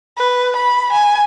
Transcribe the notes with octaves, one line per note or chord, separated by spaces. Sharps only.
B4
B5
G#5